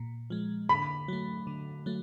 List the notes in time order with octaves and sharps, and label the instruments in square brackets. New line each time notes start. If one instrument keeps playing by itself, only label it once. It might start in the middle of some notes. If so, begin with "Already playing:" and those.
Already playing: [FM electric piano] A#2
F3 G#3
[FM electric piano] D3 [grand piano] B5
[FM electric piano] F#3 A3
D3
F#3 A3